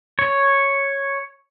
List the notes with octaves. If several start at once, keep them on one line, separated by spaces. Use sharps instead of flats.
C#5